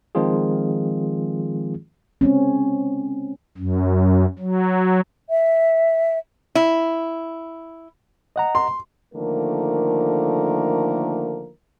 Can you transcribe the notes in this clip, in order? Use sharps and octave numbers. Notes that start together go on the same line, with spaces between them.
D#3 F3 G#3 C4 F4 G#4
G#3 C4 C#4
F#2
F#3
E5
E4
D#5 F#5 A#5
C6
D3 D#3 F3 A3 A#3 A#4